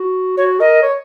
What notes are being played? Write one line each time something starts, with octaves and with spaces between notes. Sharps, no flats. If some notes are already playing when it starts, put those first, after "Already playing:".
Already playing: F#4
F#4 C#5
A#4 D#5
C#5